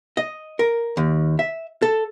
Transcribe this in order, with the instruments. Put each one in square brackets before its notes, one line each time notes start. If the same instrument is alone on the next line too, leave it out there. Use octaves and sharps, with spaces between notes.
[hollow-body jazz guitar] D#5
A#4
D#2
E5
A4